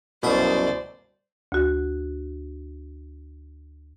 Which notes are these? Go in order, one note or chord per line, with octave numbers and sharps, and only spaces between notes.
C2 F#2 B2 C5 D5 E5 D#6
D2 F#4